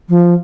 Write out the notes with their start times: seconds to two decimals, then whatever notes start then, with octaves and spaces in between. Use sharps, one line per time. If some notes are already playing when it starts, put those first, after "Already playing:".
0.09 F3